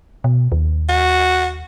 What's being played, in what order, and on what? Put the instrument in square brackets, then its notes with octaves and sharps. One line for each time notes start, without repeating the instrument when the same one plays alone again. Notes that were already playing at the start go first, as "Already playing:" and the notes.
[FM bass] B2
D#2
[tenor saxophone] F#4